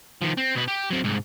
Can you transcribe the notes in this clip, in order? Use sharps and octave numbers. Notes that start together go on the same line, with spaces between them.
D#3 F3
C4
B2 B4
G4
F#3 C4
C2 G#2